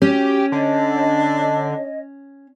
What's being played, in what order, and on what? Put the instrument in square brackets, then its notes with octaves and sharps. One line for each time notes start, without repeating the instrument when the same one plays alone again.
[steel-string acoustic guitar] C#4 [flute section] F#4 [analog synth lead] G4
[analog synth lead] D3 [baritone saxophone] D4 [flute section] C#5 D#5